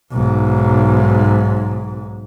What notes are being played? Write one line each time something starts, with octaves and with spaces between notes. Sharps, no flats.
B1 G#2